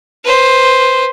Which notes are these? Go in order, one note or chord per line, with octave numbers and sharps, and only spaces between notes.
B4 C5